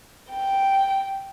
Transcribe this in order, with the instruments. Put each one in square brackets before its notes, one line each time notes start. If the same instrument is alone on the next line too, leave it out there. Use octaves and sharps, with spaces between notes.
[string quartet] G5